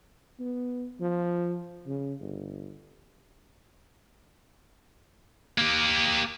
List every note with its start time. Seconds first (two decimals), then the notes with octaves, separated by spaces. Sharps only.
0.40 B3
1.00 F3
1.87 C#3
2.21 G1
5.58 A#3 G4